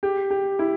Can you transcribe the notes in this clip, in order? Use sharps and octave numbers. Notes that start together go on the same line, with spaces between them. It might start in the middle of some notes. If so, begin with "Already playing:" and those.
G4
G4
E4